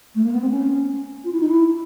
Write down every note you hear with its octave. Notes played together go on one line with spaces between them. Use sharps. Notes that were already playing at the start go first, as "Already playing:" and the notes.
A3
A#3
B3
C4
C#4
F4
E4
D#4
E4